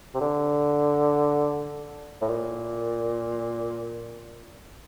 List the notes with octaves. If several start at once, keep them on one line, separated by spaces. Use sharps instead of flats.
C3
D3
A2
A#2